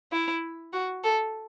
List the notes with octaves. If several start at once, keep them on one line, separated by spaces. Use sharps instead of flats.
E4
F#4
A4